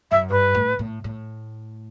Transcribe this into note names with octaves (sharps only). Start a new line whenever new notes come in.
F#2 E5
G2 B4
A2
A2
A2